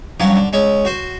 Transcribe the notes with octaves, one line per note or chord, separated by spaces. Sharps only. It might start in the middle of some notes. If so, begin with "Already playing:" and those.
G2 F3 F#3 C#4
D3
G#3 C#4 C#6
F#4 C5